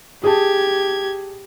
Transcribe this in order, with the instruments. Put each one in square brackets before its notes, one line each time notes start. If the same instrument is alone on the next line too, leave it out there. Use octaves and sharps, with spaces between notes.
[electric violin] G4 G#6 [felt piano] G#4 A5